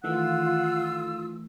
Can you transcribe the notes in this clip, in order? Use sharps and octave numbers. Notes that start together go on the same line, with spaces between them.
D#3 E3 A3 F4 F#5 E6